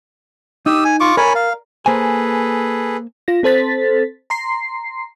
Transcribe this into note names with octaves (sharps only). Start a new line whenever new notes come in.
D#4 G4 D#6 E6
G#5
F4 C#6 D6
A#4 C#5 D5 G#5 A#5 B5
F5
A#3 G#4 A4 B4 C5 G#5
F4 A#6
C4 A4 C5 A6 B6
A#5 C6 C7